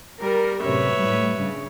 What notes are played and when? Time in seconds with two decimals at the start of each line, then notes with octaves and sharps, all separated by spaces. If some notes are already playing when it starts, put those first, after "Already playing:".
0.21 G3 A#4
0.61 F#2 A2 C3 B4 C#5 E5
0.94 A2 G3
1.36 G2 C#3